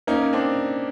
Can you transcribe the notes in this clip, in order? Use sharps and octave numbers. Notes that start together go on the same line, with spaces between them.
A#3 C#4 D#4
C4 D4